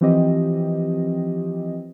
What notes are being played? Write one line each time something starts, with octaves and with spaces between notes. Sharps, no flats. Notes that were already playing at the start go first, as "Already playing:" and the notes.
E3 F3 C4 G4 D#5